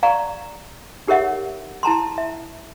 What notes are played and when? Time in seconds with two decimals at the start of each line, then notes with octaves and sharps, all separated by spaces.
0.03 D5 F5 A#5 C#6
1.08 D#4 G4 A#4 C#5 E5 F#5
1.83 E4 A5 A#5 C6
2.18 E5